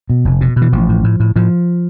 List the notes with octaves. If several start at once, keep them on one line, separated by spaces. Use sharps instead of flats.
B2
F1
B2
B2
E3
A1 F3
A2
A2
A2
A2 F3